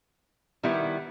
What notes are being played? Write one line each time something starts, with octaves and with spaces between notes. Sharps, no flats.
D#3 G3 B3 E4